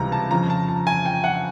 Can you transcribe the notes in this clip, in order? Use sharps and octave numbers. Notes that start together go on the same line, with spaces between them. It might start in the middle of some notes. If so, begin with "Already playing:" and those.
Already playing: C#2 C3 E3 G3 A#5
A5
F2 C#3 F3 A#5
A5
A5
G#5
G5
F#5